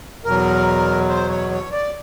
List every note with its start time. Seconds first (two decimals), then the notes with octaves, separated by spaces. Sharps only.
0.25 E2 B2 F#3 A#4
1.09 C5
1.29 C#5
1.51 C#5
1.72 D5